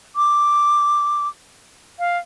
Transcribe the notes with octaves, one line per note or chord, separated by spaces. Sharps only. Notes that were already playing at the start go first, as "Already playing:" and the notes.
D6
F5